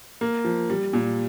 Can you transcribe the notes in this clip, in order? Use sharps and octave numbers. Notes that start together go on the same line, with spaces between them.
A#3
F3
G3
A#2